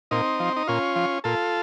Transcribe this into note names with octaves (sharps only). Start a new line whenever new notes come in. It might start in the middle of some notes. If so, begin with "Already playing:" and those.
A#2 C4 D#4
F3
D#4
A#2 C#4 F4
F3
A#2 F4 A4